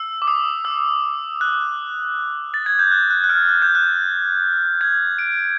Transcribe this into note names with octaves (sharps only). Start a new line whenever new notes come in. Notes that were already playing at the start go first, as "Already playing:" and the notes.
Already playing: E6
D6
D#6
E6
F#6
A6
G#6
G6
F#6
F#6
F#6
F6
F#6
G6
F#6
G#6
D7